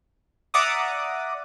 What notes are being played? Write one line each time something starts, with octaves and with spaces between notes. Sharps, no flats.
D5 E5 F#5 A#5 D6 D#6